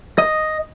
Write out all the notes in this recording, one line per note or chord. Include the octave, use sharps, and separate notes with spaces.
D#5